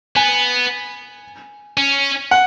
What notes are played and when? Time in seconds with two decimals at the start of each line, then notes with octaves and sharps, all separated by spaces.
0.16 B3 G#5
1.77 C#4
2.31 F#5